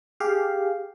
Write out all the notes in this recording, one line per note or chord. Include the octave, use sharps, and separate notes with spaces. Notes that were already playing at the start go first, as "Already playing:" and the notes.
G4 G#4 F5